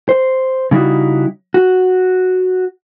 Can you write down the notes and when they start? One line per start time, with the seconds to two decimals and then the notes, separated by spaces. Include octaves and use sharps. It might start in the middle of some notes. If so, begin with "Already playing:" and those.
0.09 C5
0.71 C#3 G3 D#4 E4 F#4
1.54 F#4